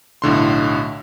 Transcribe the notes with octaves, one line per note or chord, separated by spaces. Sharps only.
B1 A2 D3 C6